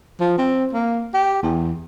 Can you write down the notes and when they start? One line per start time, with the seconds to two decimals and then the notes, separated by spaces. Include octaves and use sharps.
0.21 F3
0.38 C4
0.73 A#3
1.14 G4
1.43 E2